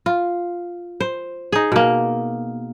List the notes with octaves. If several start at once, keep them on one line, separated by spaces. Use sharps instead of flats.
F4
C5
D#4 G#4
B2 A#3